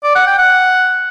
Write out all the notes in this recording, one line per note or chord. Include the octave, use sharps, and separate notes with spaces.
D5
F#5
G5
F#5